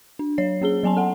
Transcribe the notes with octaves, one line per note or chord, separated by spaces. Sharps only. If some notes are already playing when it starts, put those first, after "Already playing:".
D4
F#3 C#5 C7
A#3 C#4 G#4 G7
F#3 B3 G#5 A5 C6
A4 F#5